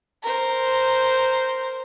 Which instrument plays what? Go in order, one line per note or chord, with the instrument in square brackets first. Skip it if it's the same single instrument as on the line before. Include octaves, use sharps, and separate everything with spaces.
[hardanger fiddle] A#4 C5